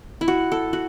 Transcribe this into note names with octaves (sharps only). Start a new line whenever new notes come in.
E4
F#4
A4
F#4